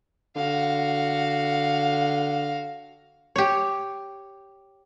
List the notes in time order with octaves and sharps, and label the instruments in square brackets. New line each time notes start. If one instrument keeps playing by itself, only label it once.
[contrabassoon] D3 [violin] F#4 F5
[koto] G4 C#5